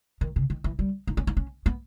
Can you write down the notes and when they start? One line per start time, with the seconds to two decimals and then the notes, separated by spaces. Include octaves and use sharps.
0.21 D#3
0.36 C#3
0.50 D#3
0.64 E3
0.79 G3
1.07 D#4
1.17 C#4
1.27 D#4
1.37 C#4
1.66 B3